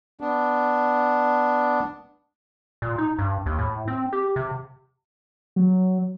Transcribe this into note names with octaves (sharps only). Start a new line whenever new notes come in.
B3 D4
A#2
D#4
G2
D#2
A2
C4
G4
C3
F#3